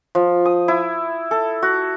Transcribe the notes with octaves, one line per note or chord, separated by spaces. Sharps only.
F3
D#6
E4
A4
F#4